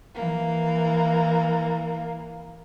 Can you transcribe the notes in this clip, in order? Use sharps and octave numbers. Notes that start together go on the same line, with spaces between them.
E3 A#3